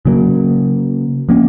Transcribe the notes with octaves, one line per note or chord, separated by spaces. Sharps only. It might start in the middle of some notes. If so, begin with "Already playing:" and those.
C#3 F#3 A#3
F3 A#3 C#4